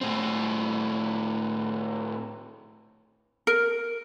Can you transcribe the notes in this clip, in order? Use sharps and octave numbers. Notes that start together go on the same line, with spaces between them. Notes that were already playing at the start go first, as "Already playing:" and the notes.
A2 C4
A#4